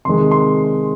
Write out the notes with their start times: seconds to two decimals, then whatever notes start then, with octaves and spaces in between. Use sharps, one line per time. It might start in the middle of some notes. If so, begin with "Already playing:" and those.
0.05 C3 D#3 G#3 C6
0.31 C6